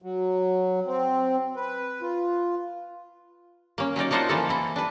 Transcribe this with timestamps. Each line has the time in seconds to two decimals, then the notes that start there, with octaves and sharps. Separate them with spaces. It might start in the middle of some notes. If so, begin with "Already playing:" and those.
0.02 F#3
0.86 C4
1.56 B4
2.01 F4
3.78 A#3 C#4
3.96 F#3 C#4 D#4 D5
4.11 A#3 D4 D#4 F4 C5 F#5
4.29 E3 F3 A#3 A4
4.49 E3 E4
4.76 D4 B4